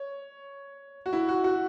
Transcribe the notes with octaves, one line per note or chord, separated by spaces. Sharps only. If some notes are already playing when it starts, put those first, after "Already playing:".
Already playing: C#5
F#4
E4
F#4
F#4